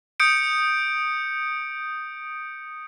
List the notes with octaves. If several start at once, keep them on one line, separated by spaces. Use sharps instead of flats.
D#6 G6 C#7 D7